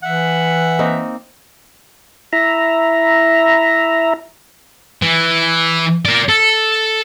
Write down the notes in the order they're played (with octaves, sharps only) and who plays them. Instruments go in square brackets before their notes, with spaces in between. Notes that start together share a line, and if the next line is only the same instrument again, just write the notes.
[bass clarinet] E3 [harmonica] E5 F#5
[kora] A#3 C4 D#4
[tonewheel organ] E4 E5 A#5
[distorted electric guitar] E3
A#4 D5
A4